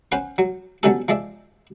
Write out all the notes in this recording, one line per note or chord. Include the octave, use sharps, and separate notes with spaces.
C#4 B4 C5 F#5 C6
F#3
B2 D3 F#3 C#4 G4 A4
F3 G#3 D5 E5